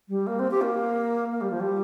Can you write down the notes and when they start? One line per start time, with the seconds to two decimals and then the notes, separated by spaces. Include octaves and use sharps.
0.08 G3
0.27 A#3
0.39 C4
0.51 G4
0.61 A#3
1.32 A#3
1.41 G3
1.50 F3
1.60 G3